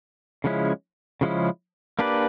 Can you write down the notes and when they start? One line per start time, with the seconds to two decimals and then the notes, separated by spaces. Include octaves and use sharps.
0.44 C#3 F3 G#3 C#4 E4
1.21 C#3 F3 G#3 C#4 E4
1.99 A#3 D4 G4 B4 D5